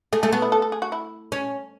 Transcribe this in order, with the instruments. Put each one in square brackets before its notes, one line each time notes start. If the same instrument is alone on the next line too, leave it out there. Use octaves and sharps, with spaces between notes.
[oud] A3 [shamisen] G#4
[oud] A3 [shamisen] G#4
[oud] B3 [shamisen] F#4
[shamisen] E4
A4
A4
G#4
F#4
E4
[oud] C#4